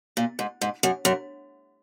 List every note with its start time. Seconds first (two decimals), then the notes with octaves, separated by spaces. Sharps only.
0.17 A#2
0.39 G#2
0.61 G#2
0.83 F#2
1.05 F#2